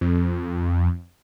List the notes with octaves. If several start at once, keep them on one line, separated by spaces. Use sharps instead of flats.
F2